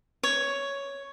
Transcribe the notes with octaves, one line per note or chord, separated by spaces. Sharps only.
C#5